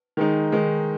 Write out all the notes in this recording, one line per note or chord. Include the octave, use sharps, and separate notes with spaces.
D#3 G#3 D#4
D#3 G#3 D#4